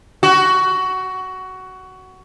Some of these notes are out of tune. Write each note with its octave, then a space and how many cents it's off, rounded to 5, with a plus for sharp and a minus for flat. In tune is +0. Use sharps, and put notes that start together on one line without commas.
F#4 +15